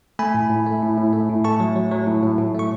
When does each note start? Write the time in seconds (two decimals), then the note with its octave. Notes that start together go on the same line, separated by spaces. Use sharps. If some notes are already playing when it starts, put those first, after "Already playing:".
0.19 A3 G#5 B5
0.34 A2
0.50 A2
0.66 A3
0.82 A2
0.97 A2
1.13 A3
1.29 A2
1.44 A3 A5 C#6
1.60 F#3
1.76 F#3
1.92 F#3
2.07 A2
2.23 A2
2.38 A2
2.55 A3 C#6